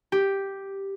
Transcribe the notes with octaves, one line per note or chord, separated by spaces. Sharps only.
G4